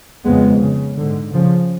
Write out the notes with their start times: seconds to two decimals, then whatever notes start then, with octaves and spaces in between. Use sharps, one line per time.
0.25 F2 C#3 G#3 B3
0.62 C#3
0.97 G#2 D3
1.33 C#3 F3